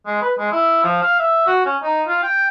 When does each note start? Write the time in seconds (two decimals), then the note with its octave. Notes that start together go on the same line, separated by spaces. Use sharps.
0.06 G#3
0.22 B4
0.38 G#3
0.52 E4
0.84 F3
1.02 F5
1.19 E5
1.46 F#4
1.66 C#4
1.83 D#4
2.08 F4
2.23 G5